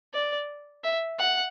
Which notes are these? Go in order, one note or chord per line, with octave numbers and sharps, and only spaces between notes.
D5
E5
F#5